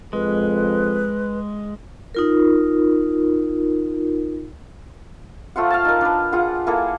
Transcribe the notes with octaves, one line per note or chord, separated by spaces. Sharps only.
F2 G#3 B4
D#4 F4 A#4
A3 F4 C5 F#5
F5 A5
D#4 A#4
D4 B4
F4 G#4 F#5
A#3 E4 G#4 A4